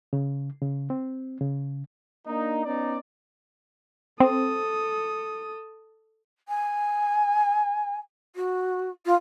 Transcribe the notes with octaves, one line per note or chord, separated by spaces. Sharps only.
C#3
C#3
C4
C#3
A#3 D4 D#4
B3 C#4 D#4 D5
C4 A4 D#6
G#5
F#4
F4